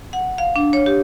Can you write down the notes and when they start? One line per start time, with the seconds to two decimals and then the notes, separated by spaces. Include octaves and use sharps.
0.13 F#5
0.38 F5
0.56 D4
0.73 C#5
0.86 G4